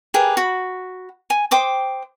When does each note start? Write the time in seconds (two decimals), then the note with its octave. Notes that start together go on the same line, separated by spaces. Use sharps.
0.14 G4 G#4 A#4 B4
0.37 F#4 B5
1.30 G#5
1.51 C5 G5 D6 D#6